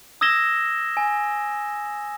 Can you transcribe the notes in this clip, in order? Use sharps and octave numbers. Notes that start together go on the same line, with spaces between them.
D#6 E6 G#6 A#6 E7 G7
G#5